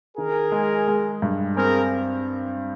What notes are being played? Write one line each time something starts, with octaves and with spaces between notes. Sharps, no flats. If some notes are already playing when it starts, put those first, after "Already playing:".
D#3 G#4 A#4
G#3
G#3
G2
C4 G#4 A#4